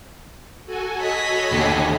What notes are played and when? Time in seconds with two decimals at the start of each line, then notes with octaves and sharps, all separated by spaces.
0.66 F#4 A4 G#5
1.00 C#5 D#5 B5
1.52 D#2 D3